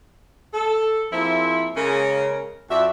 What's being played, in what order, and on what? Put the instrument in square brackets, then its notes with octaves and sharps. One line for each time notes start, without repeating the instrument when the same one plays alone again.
[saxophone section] A4
F3 A#3 C4 E4 G#4 E5
C#3 G#3 A#3 C#4 A#4
F2 F#4 D5 E5